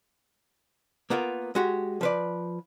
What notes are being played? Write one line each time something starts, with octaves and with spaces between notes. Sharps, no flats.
A#3 B3 F4 A#4
G#3 F#4 G4
F3 B4 D5